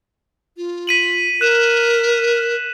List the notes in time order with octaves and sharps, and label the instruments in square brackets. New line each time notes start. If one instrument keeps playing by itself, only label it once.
[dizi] F4
[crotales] B6 D#7 F#7
[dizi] A#4 [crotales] F#6 E7